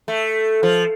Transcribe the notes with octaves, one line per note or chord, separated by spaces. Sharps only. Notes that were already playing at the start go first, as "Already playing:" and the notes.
A3
F3